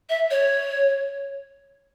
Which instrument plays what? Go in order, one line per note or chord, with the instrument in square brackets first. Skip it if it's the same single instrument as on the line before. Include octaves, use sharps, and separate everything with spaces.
[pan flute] E5
C#5